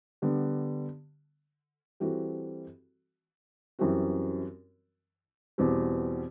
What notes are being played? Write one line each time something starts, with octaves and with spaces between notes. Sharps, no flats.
D3 G3 B3
E3 G3 C4 F#4 A4
F#2 E3 G3 C4 F#4
E2 B2 G3 C4